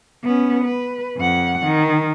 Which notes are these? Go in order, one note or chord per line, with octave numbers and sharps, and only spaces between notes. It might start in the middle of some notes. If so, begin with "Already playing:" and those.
B3 C#4
B4
F2 F#5
D#3